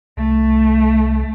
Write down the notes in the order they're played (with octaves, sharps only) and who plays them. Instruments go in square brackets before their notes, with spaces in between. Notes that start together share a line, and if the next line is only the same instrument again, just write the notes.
[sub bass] C2 [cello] A3